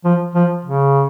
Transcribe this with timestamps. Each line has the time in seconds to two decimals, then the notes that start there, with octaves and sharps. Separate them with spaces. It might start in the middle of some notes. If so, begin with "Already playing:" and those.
0.04 F3
0.35 F3
0.65 C#3